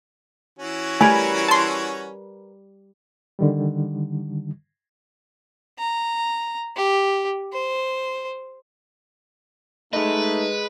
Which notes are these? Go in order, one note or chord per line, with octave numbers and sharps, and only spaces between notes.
E3 C#4 F#4
G3 A3 A#4 B4 G#5
A5 C6
D3 D#3 G3
A#5
G4
C5
A3 D#4 G#4 B4 D#5